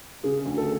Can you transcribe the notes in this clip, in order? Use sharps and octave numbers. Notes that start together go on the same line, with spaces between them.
C#3 G#4
D2
A4